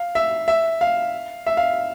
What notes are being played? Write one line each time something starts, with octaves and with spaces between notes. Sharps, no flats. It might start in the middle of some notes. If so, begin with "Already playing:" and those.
Already playing: F5
E5
E5
F5
E5
F5